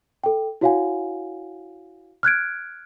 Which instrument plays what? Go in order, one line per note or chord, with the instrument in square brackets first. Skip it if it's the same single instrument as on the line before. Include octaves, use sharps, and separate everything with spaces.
[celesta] A4 G5
E4 F#4 C#5 F5 F#5 G#5
F6 F#6 G#6 D7